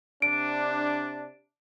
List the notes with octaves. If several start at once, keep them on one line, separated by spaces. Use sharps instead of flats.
C3 D4 D7